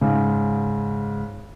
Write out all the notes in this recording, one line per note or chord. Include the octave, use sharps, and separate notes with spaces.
G#2 C#3